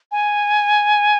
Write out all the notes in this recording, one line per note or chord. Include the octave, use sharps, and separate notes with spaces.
G#5